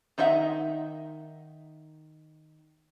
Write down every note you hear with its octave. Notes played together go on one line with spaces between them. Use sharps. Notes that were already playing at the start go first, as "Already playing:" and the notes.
D#3 D#4 D#5 E5 F#5